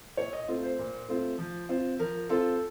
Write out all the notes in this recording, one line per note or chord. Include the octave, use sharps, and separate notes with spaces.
A#2 C#5
D#5
A3 C4 F4
C5
A#2
A3 C4 F4
F3
C4 F4
F3 A#4
C4 F4 A4